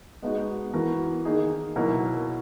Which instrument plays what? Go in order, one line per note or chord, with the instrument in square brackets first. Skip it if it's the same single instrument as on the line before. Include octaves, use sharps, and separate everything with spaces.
[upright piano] G#3 B3 D#4 F#4
E3 B3 F#4 A#4
D#3 A#3 D#4 G#4
B2 F#3 A#3 E4 A#4